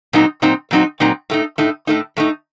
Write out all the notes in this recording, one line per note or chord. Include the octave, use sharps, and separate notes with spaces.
A#2 F#3 C4 D#4
A#2 F#3 C4 D#4
A#2 F#3 C4 D#4
A#2 F#3 C4 D#4
A2 A3 D#4
A2 A3 D#4
A2 A3 D#4
A2 A3 D#4